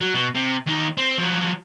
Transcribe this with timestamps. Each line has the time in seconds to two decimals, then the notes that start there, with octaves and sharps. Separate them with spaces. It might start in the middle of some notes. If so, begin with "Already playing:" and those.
0.01 F#3
0.14 B2
0.35 C3
0.66 D#2 D#4
0.97 C4
1.18 F3 F#3